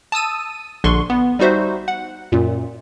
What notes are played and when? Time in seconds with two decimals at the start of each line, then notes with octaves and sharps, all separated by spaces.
0.12 A5 D#6 E6 D#7
0.84 A#1 D3 D4 C6 C#6
1.10 B3
1.39 G3 D#4 F#4 C5 E5
1.88 F#5
2.32 F#2 A#2